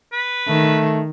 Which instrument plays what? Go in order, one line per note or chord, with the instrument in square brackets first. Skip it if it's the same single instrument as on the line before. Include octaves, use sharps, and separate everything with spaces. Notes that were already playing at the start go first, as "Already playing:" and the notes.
[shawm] B4
[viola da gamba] D#3 [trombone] A3